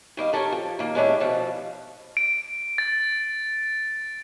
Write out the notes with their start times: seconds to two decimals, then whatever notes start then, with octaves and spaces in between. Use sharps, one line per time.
0.17 D#3 G3 D#5 F5
0.33 G4 A4 A#4 C#5 E5 G#5
0.52 F3
0.79 D#3 A#3
0.95 G3 G#3 C#4 D4 E4 G4
1.20 D#2 B2 F3
2.17 D7
2.78 A6